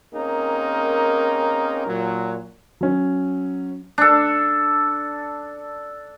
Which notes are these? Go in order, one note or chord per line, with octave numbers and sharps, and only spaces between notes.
A#3 C4 C#4 D#4 G#4 A#4
A#2 F#3
F#3 C#4
D4 A4